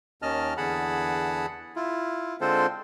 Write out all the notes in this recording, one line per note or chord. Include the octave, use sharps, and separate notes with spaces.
D#2 D#3 C#4 D#5 A5 F6
E2 D3 G#4 F#5 A5 B5
E4 F4
D3 G#3 C4 F4 A4 C5